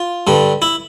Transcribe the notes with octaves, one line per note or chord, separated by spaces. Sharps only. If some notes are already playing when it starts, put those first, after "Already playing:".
Already playing: F4
G2 D3 G3
E4